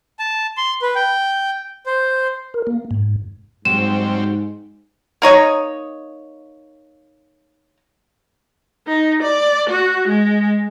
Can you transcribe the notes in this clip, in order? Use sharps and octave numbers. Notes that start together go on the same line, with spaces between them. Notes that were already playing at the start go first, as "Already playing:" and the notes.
A5
C6
B4
G5
C5
A#4
A#3
G#2
G#2 F#3 G3 C4 E7
A#3 D#4 C#5 D#5
D#4
D5
F#4
G#3